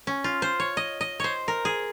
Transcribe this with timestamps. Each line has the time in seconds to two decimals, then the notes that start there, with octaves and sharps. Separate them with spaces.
0.07 C#4
0.24 F4
0.42 C5
0.60 C#5
0.77 D#5
1.01 D#5
1.20 C5 C#5
1.48 A#4
1.65 G#4